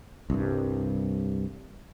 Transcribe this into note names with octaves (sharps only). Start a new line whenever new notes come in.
C2 G2